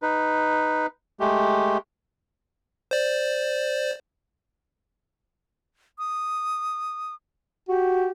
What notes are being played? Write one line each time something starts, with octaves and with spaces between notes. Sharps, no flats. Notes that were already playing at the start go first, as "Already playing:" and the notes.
D#4 B4
G#3 A3 G4
C5 D5
D#6
F#4 G4